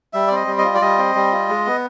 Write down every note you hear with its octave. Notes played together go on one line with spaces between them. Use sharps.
G3 E5
D5
C4
D#5
G3
D#5
F4
D5
G3 D#5
C4
G3
F4
G#3
B3